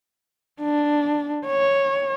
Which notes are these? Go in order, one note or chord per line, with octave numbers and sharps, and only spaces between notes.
D4
C#5